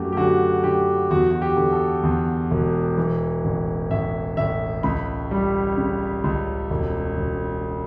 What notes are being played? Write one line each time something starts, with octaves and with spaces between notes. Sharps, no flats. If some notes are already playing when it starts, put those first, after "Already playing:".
Already playing: F#2 A3 F#4 G4
G4
D3 F#4
D3 G4
E2 F#4
F#4
G4
D3
A4
E2
E1
E3
A1
A1 E5
A1 E5
C#2 B5
G3
C#3
C#2
E1
E1